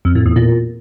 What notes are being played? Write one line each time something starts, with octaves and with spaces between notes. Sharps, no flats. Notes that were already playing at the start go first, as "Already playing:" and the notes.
F2
A2
E2
A#2